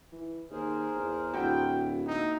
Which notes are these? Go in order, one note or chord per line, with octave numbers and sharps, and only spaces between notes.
E3
D#2 G#4 A#4 C5
E2
D1 E4 F#4 G5
A#3 D#4 E5 G5